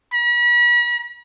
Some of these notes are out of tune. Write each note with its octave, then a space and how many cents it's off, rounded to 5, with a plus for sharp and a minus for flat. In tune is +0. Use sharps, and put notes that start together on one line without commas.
B5 -40